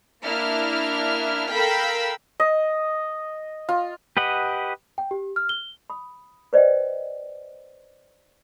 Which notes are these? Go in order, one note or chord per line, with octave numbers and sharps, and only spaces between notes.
A#3 D4 E4 F6
A4 A#4 F5 G5 B5 E6
D#5
F4
G4 B4 D#5 F#5
G5
G4
F6
G7
B5 D#6
B4 C5 D5 D#5 F#5 G5